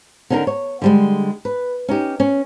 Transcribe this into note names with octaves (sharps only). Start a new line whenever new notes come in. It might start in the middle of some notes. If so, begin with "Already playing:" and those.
D3 C#4 D#4 A4 A#4
C#5
D3 G3 G#3
B4
C#4 D#4 G4
C#4